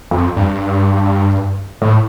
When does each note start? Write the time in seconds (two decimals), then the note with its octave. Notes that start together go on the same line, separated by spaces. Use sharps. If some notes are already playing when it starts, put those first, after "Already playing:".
0.11 F2
0.36 G2
1.82 A2